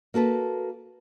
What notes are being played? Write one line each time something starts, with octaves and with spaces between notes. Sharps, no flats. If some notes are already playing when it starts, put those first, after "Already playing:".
A#3 F#4 A4 B4